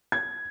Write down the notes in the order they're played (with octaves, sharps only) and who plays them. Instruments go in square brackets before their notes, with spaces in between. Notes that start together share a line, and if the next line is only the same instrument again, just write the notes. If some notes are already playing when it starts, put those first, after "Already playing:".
[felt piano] G#6